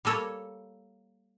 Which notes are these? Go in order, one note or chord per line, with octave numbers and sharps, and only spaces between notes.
G3 A#3 A4 C#5